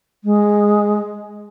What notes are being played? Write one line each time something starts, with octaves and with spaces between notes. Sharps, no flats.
G#3